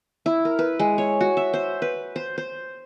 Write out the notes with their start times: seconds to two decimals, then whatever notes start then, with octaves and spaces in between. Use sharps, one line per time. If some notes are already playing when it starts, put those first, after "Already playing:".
0.26 E4
0.45 A#4
0.59 B4
0.79 G#3
0.98 C#5
1.21 F#4
1.37 E5
1.54 C5
1.82 B4
2.16 C5
2.38 C5